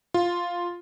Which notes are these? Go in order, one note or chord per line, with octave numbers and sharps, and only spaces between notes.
F4